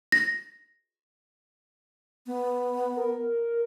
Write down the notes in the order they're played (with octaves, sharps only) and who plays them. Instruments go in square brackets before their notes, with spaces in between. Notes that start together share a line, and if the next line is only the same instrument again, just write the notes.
[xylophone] A#6
[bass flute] B3
[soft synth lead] A#4